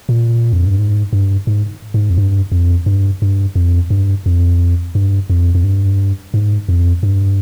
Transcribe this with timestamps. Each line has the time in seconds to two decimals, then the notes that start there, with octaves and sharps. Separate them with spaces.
0.09 A#2
0.53 F2
0.65 G2
0.79 G#2
1.13 G2
1.47 G#2
1.94 G#2
2.10 F2
2.17 G2
2.52 F2
2.86 G2
3.22 G2
3.56 F2
3.90 G2
4.26 F2
4.95 G2
5.30 F2
5.55 F2
5.64 G2
6.34 G#2
6.69 F2
7.03 G2